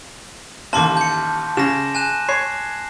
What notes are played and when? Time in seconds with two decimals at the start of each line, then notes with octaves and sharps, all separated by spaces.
0.73 A1 D#2 A5 C6 D6
0.97 G6 C#7
1.57 C#3 A#6 E7
1.95 G#5 F#6 E7
2.29 C#5 C7